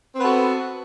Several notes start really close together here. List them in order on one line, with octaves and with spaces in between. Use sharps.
C4 B4 B3 A4 F#4